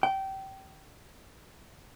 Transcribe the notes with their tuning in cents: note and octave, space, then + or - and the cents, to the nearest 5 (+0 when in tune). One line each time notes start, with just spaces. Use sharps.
G5 -25